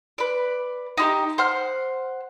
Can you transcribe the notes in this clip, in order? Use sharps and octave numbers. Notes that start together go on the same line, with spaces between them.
B4 D5
D#4 E4 G4
C5 F#5 F6